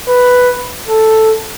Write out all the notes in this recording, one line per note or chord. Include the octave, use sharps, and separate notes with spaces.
B4
A4